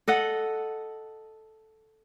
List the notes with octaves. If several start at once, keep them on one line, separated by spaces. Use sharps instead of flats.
A4 D#5 F#5